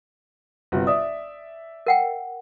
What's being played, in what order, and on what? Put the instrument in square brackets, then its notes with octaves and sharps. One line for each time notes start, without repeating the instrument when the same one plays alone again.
[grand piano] G1 C3 F#4
[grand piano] D5 E5 [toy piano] D#6
[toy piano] A#4 F#5 G5